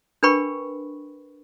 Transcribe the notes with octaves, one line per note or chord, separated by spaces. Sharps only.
D4 A#4 B4 G5 B5 C#6